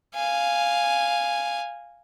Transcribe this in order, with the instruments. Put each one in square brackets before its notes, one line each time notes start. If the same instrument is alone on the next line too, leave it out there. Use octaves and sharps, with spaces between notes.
[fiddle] F5 G#5